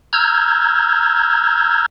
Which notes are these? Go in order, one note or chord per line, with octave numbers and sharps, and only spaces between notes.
A#5 E6 F6 G6 G#6